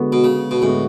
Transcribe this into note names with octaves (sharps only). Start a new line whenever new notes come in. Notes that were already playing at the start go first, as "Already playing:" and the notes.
Already playing: D3 G#3 B3 F#4
B2
C#3
B2
A2 D3 G#3 B3 F#4